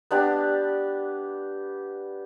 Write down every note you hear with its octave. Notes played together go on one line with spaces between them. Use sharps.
B3 D4 G4